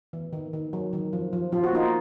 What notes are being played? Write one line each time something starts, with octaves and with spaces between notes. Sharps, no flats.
E3
D#3
D#3
F#3
D#3
F3
F3
F3 F4
F#4
A#3 D#4 F4